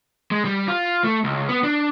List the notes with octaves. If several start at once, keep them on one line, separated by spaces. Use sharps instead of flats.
G#3
G3
F4
A3
C#2
B3
D4